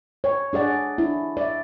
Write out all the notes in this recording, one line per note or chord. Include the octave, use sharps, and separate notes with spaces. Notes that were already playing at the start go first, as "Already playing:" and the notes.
C#5
D4 G#4 D5 F#5
D4 E4
D5 E5